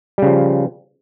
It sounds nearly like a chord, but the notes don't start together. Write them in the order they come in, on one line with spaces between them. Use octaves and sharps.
G3 C#3 F3